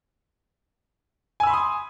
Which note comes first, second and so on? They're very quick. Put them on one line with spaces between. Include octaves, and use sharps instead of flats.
G#5 E6 B5 C6 D#6